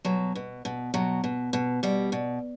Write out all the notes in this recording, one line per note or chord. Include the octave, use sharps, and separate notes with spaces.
B2 F#3
B2
B2
B2 F#3
B2
B2
B2 G3
B2